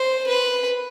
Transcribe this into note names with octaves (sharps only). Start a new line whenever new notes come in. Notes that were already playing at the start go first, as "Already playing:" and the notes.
Already playing: C5
B4